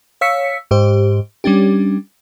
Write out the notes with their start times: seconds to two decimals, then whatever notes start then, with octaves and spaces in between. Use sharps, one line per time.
0.21 C#5 F5 E6 B6 C#7
0.71 G#2 G4 C5
1.44 G3 C#4 D4 G4